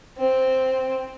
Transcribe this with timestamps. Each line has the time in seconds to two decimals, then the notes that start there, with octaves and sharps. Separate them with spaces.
0.18 C4